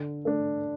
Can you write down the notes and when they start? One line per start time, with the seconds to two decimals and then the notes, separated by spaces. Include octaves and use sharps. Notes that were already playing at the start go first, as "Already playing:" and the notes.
Already playing: D3
0.25 A3 D4